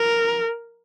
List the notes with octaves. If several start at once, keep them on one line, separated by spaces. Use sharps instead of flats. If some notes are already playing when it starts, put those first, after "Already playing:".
Already playing: A#4